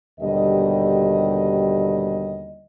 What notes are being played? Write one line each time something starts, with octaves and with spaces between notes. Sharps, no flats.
D#2 B2 D3 G3 D#5